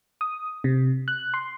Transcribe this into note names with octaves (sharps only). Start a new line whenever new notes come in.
D#6
C3
F#6
C6